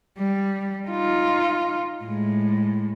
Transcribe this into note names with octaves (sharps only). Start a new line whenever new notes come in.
G3
D#4 F4
A2 G#3